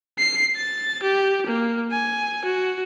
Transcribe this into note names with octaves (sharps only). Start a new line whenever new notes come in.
C7
A6
G4
A#3
G#5
F#4